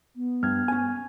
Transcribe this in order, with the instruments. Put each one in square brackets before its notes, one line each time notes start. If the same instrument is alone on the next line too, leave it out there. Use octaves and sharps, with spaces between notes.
[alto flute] B3
[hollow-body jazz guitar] G2 [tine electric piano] F6 G#6
[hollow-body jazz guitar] C#4 G#5